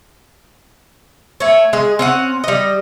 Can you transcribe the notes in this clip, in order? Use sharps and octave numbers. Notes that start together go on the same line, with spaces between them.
A3 C#5
G#3 G#4
C4 C#4 F#5
G3 D#5